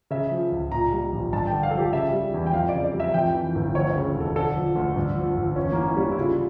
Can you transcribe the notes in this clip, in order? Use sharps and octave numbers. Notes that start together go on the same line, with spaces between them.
C#3 E5
F3
C#2
A#2 A#5
G3
A#1
G2 A5
G5
D3
F5
F3 A4
G4
C#3 E5
G3
E2
G5
F2 F5
C#3 D5
D5
G3
E5
F2 G5
E3
G1
D2 C#5
C#5
C#3
E1
A4
D3 A4
F3
D2
G2
F3
G1
E2 C#4
E3 A#3
C#4
G3
D4
E4
C#3 F4